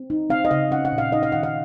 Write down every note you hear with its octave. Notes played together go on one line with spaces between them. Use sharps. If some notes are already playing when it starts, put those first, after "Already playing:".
Already playing: C4
D#4
C4 F5
D#5
C#3 F5
C#4 F#5
F#5
A#2
F5
D#4 D#5
F5
D#3 F#5
F5